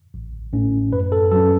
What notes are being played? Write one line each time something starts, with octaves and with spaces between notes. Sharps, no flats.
A1
A2 A3 C#4
F#2 B4
A4
F#3 C#4 A4